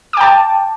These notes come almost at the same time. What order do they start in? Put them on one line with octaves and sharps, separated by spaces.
D6 G5 A5